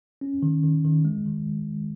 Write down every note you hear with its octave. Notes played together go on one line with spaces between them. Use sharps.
C#4
D#3
D#3
D#3
G#3
D#3